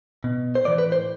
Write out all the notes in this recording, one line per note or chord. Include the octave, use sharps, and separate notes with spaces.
B2
C5
A2 E3 D5
B4
C5